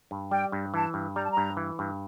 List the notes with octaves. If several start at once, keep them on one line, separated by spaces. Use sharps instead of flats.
G2
G3 G5
G2
E3 A5
G2
G3 A#5
A5
A#5
G2
E3
G2